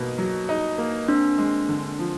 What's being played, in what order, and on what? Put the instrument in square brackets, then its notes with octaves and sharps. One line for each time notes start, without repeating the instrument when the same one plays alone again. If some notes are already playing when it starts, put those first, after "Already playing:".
Already playing: [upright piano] B2 A#3 D#4
F#3
D#4
A#3
[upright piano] C4 [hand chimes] D4
[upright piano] G#3
D3
F3